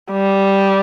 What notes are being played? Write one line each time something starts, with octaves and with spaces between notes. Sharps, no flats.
G3